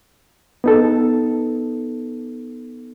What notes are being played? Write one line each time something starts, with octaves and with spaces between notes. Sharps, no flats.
B3 D#4 A4